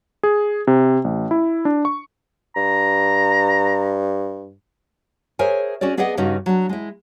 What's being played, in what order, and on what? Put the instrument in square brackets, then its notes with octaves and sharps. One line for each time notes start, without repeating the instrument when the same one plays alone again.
[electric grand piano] G#4
C3
A1
E4
D4
C#6
[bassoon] G2 [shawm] A#5
[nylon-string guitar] G#4 A#4 C5 C#5 E5 G#5
C#4 F#4 G#4 C#5 D5
B3 G#4 B4 D5 D#5 F#5
G2 C#3 C#4 D#4 F#4
F#3 D4
G#3 E4